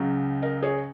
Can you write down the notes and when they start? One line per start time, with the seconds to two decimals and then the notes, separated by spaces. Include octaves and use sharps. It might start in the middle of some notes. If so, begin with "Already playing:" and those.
Already playing: C#2 C#3 F#3
0.42 A#4 D#5
0.63 G#4 C#5